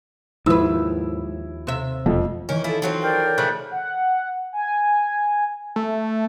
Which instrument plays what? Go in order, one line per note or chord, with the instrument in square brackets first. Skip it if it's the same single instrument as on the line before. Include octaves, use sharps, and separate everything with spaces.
[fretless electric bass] D#2 [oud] G#2 B4 [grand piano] F3 E4 E6
[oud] C3 E5
[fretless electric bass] E1 A3 [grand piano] F2
[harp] D#3 E3 [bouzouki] C#4 A#4
[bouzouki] E4 G#4 [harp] F4 A4
[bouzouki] F3 F#3 C4
[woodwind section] A#4 D5 G5
[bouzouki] C#3 F3 A3 [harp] F#6
[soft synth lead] F#5
G#5
[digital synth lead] A3